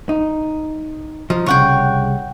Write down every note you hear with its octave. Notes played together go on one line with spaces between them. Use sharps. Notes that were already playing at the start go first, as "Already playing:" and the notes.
D#4
F3 D#4
C2 C#3 C#5 F#5 G5